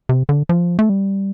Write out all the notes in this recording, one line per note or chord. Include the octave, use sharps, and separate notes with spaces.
C3
D3
F3
A3
G3